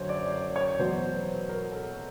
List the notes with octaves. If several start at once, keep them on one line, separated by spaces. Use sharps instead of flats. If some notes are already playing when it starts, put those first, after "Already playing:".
Already playing: F#2 D3 F#3 C5 C#5
D5
D5
C#5
E2 B2 F#3 C5
B4
A#4
A4